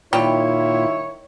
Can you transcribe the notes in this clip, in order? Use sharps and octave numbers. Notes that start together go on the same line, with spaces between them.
A#2 D#3 G3 E4 F4 C#5